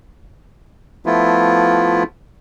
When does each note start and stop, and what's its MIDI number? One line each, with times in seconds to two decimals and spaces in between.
1.06 2.03 53
1.06 2.03 57
1.06 2.03 59
1.06 2.03 64
1.06 2.03 65